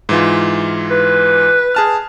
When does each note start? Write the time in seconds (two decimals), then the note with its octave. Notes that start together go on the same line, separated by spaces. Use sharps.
0.09 G#2 E3 F4
0.91 B4
1.75 G#4 A5 F6